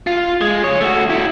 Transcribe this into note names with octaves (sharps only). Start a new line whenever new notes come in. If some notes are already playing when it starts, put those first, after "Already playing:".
F4
G#3
C#3 C#5
A3 F#4
E4 F#4